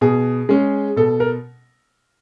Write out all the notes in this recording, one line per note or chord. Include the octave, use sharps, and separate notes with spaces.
B2 G#4
G#3 C#4
B2 A4
A#4